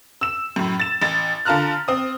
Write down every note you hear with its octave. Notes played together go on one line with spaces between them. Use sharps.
E6 E7
F#2 A2
A6 E7
A1 A6
D3 F4 A5 A#5 F6 F#6
C4 D#6